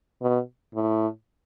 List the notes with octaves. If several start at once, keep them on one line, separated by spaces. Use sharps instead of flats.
B2
A2